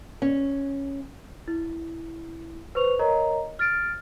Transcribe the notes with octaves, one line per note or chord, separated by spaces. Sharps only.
C#4
E4
B4 C5 C#6 F7
A#4 C#5 D#5 A#5
F6 A6 D7